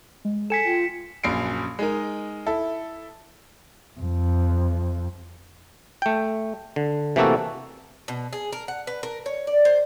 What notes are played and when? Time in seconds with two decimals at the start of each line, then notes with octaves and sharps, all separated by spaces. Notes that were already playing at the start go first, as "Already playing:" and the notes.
0.25 G#3
0.50 A4 G#5 B6 C#7 E7
0.65 F4 G5
1.24 A#1 F#2 C7 D7
1.79 G#3 D#4 A#4
2.46 E4 A4
4.00 F2
6.02 A3 G5
6.76 D3
7.16 C3 E3 A3 A#3 F#4 A4
8.08 B2
8.33 G#4
8.53 A#4
8.68 F#5
8.87 B4
9.03 A#4
9.26 C#5
9.47 D5
9.65 C5